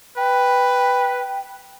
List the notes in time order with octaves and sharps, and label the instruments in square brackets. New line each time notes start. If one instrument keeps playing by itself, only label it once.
[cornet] B4 [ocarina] G5